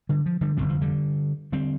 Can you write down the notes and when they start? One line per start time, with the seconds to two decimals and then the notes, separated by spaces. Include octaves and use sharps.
0.09 D3 G3
0.26 F3
0.41 D3 G3
0.57 F1 F2 D3 G3 C4
0.69 F3
0.81 D3 G3
1.52 D3 G3 C4